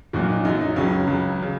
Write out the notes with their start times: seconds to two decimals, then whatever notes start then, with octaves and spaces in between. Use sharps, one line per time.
0.13 A#1 A#2 F#3 F#4
0.30 D#4
0.45 F#2 F#3 D#4
0.61 D#4
0.76 C#2 C#3 F#3 C#4
1.07 C#2 C#3 F#3
1.42 C#3